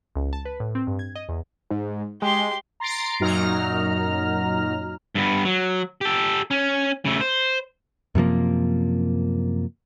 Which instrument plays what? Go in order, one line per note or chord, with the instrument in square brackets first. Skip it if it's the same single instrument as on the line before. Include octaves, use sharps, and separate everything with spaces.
[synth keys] C#2
A5
B4
A2
C4
G2
G#6
D#5
E2
[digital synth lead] G#2
[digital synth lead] G#3 [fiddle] G4 C6
[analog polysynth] A#5 C6 A6 C7 D7
F#2 A#2 F#3 D#4 A#5 F6
[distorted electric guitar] G2 B3
F#3
G4 A4
C#4
C#3 A3
C5
[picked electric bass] F#2 C3 F3 A#3